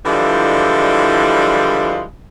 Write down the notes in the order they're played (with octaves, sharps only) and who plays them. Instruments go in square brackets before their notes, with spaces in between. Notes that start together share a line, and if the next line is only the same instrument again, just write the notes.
[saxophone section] D3 E3 F3 G3 G#3 E4